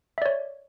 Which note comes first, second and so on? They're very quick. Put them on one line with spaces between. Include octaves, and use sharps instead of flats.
E5 D5 C#5